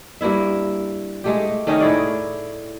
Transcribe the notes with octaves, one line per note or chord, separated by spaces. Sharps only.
G2 A#3 E4 E5
G#3 A3 G4
D#3 A3 C#4 D#4
A2 E4 G#4 D5